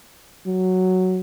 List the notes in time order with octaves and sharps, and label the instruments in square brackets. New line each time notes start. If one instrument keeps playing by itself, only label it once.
[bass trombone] F#3